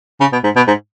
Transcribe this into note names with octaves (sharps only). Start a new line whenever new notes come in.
C#3
B2
G#2
B2
G#2